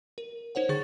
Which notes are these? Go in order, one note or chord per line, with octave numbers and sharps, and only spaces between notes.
A#4
D#4 C5 C#5 F#5
D3 G#4 C#6 A6